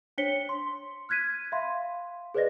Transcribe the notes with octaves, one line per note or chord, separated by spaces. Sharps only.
D4 C5 C#5 B6 C#7 G7
C6
F6 F#6 G#6 B6 D#7
E5 F5 B5 C6
G#4 B4 C5 D5 D#5 A#6